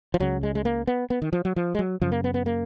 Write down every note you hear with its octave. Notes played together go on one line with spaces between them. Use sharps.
F3
C#2 C#3 F#3
G#3
G#3
A#3
B3
B3
D#3
F3
F#3
F3
G#3
F#3
F#2 C#3 F3
A#3
B3
B3
A#3